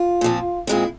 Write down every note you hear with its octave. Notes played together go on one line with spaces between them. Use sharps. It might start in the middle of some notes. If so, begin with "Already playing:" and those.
Already playing: F4
A#2 F3 C4
A#2 G#3 C4 E4